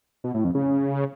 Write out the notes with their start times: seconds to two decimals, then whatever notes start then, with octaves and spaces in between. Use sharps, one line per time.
0.24 B2
0.34 A2
0.44 F2
0.55 C#3